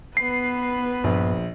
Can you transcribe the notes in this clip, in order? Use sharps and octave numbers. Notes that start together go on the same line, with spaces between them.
B3 B4 C7
A#1 G2